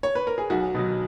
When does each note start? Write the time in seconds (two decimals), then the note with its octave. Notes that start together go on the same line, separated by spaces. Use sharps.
0.03 C#5
0.15 B4
0.27 A#4
0.38 G#4
0.50 B1 F#4
0.74 B2 F#3